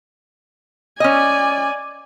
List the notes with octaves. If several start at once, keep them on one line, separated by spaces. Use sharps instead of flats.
C#4 D5 D#5 G#5